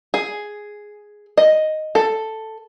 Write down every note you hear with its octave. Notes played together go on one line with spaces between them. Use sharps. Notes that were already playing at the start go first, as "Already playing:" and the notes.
G#4
D#5
A4